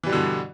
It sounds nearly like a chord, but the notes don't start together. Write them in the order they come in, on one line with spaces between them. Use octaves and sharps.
E3 G3 B2 D3 G2